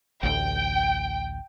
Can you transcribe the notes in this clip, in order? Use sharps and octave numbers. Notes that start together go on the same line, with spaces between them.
A1 D2 G5